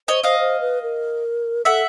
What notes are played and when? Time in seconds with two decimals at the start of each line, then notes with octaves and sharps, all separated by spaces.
0.08 C5 C#5 D#5
0.24 C5 D#5 F5
0.40 C5
0.61 B4
0.82 A#4
1.65 A4 E5 F#5